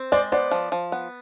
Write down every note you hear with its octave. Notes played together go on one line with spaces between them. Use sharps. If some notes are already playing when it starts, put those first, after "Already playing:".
Already playing: C4
G#3 C5 D5
B3 C5 D5
F3
F3
B3